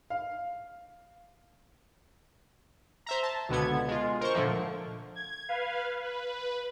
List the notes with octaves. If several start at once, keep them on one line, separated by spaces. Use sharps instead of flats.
F5
C5 E5 A#5
A5
C#2 B2 D3 B3 G#6
G#3 F4
A#4 C5 C#6
A#2 D3 F3 A3 A#3
G#6
B4 F5
B4